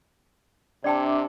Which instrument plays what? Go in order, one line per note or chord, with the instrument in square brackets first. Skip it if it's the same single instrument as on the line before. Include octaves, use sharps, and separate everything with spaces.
[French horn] C3 [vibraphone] D4 E5 D6 [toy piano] D5 G5 A5